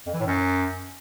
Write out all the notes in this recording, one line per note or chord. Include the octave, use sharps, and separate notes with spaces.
F2
E3
A2
F#2